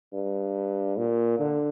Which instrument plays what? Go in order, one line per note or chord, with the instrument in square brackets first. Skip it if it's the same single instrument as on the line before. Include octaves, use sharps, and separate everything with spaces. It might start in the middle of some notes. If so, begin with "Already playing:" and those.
[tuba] G2
A#2
D3